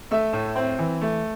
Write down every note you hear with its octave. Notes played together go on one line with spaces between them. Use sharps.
A3 E5
A2
C4
E3
A3